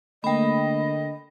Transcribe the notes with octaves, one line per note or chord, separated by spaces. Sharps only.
D3 A3 A#3 D#5 G5 B5